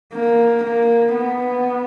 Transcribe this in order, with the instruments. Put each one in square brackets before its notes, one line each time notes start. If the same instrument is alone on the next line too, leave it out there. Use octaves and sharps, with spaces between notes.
[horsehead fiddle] A#3
A#3
B3